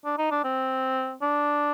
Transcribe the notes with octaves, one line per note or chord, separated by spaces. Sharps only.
D4
D#4
D4
C4
D4